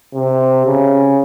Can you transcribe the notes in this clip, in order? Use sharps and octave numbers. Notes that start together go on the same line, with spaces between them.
C3
C#3